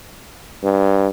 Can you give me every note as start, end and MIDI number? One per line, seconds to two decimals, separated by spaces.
0.63 1.08 43